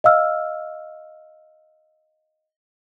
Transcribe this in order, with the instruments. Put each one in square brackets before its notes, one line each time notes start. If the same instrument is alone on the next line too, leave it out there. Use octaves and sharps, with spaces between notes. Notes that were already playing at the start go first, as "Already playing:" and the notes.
[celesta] D#5 F5 E6 F6